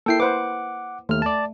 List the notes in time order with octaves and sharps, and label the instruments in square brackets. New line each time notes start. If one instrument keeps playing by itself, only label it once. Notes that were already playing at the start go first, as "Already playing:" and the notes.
[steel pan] A#3 E4 [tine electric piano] A4 G5 C7
[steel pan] B4 C5 [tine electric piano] F#5 D6
[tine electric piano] D#2 F6 [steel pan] A3
[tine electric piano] D5 A5